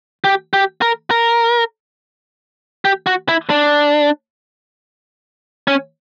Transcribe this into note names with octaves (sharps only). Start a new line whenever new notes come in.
G4
G4
A#4
A#4
G4
F#4
E4
D4
C#4